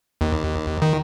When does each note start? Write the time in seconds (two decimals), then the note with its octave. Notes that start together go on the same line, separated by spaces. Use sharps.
0.21 D#2
0.82 D#3